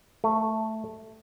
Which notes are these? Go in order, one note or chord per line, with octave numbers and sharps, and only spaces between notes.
A3